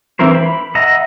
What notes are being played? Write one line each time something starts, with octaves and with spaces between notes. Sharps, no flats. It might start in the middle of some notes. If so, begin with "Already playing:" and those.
E3 C4 E4 A#4 C5
B5
D#5 E5 F#5 A#5